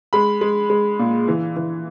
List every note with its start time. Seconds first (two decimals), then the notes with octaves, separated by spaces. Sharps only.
0.13 G#3 B5
0.41 G#3
0.70 G#3
0.99 A#2
1.28 E3
1.56 E3